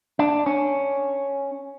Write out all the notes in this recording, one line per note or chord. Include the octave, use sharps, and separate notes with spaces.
D4
C#4